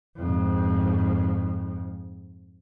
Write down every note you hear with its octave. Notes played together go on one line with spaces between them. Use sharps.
F2 G#2